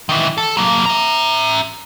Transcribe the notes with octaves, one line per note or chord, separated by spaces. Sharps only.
D#3 E3
A4
F#3 A#3
E5 A#5